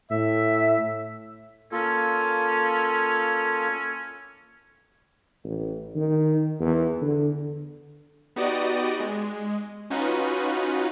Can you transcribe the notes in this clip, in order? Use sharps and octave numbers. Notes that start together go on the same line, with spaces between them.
A2 E5
A#3 C#4 F4 A4
A1
D#3
E2
D3
B3 D#4 F#4 G4 D5 D#5
G#3
C#4 D#4 F4 F#4 B4